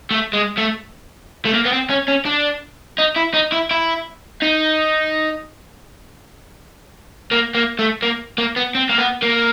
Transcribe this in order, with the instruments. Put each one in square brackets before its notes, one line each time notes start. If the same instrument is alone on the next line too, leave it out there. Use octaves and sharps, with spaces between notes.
[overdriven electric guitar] A3
G#3
A3
A3
A#3
B3
C4
C#4
C#4
D4
D#4
E4
D#4
E4
E4
D#4
A#3
A#3
A3
A#3
A#3
B3
C4
A#3
B3
A#3